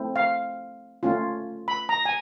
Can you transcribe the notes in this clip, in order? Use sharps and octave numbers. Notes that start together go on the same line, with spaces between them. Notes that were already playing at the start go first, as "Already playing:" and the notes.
Already playing: A3 C4 E4
F5
A3 C#4 F4
B5
A#5
G#5